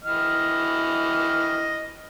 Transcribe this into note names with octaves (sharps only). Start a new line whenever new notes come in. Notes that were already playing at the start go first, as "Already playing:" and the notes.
E3 D#5 F6